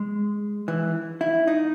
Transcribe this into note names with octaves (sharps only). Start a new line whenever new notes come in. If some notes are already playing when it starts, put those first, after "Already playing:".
Already playing: G#3
E3
E4
D#4